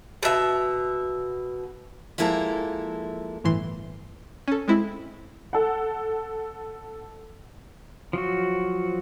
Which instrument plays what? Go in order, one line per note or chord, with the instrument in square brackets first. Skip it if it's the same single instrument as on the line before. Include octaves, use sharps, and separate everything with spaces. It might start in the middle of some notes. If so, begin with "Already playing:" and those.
[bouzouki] B2 E5
[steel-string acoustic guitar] F3 G#3 A#3 E4 A4 A#5
[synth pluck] G1 A2 E3 C6
C#4 A4
G#3 C4 E4
[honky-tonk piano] A4 F#5
[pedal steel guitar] F3 F#3 F#4